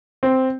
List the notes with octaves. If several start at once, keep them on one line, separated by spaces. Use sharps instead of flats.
C4